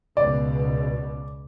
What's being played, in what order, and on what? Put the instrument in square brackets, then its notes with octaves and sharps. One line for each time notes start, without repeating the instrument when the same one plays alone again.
[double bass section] C#2 B2 [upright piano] D5